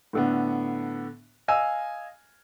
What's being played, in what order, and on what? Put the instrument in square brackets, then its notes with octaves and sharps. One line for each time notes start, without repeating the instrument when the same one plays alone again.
[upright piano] A2 D3 B3
D#5 F5 G#5 E6